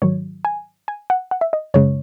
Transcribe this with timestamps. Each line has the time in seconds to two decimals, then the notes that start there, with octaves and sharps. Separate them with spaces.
0.02 G#2 D#3 F#3 C#5
0.45 G#5
0.88 G#5
1.10 F#5
1.31 F#5
1.41 E5
1.53 D#5
1.74 F#2 C#3 G#3 C#5